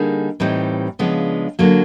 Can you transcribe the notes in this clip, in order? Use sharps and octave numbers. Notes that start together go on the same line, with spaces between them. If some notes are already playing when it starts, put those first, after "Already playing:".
Already playing: D3 G3 A#3 D#4 G#4
A2 E3 G3 C4 D#4
C#3 F3 G#3 B3 D4
D3 F#3 A#3